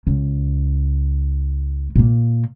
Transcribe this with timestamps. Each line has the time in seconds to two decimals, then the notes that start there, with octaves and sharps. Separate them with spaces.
0.07 C#2
1.95 A#2 A#3